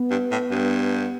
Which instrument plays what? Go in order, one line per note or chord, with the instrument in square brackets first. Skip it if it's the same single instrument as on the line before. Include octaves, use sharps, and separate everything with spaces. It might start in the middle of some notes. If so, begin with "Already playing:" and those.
Already playing: [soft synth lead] B3
[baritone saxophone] G2
A2
G2